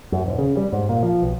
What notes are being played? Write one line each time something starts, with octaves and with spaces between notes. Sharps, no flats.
F#2
D#1
C#3
G3
G#2
A#2
F3
B1